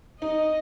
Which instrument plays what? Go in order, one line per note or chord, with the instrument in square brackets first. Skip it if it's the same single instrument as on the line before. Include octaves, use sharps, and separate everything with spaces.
[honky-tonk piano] D#4 [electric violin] D#5